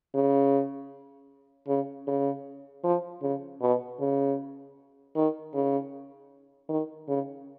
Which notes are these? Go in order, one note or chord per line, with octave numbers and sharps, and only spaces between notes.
C#3
C#3
C#3
F3
C#3
B2
C#3
D#3
C#3
D#3
C#3